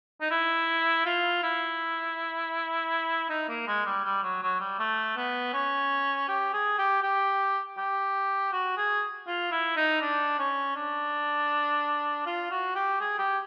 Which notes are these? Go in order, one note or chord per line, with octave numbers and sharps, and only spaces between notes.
D#4
E4
F4
E4
D#4
A#3
G#3
G3
G3
F#3
F#3
G3
A3
B3
C#4
G4
G#4
G4
G4
G4
F#4
G#4
F4
E4
D#4
D4
C#4
D4
F4
F#4
G4
G#4
G4